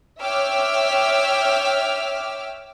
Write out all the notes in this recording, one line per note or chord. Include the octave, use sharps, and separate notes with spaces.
C#5 E5 G5 D6 E6 F6